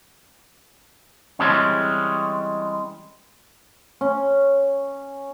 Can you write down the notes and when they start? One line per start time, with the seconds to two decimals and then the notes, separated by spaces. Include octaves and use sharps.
1.39 E3 G3 G#3 C4 C#4
4.01 C#4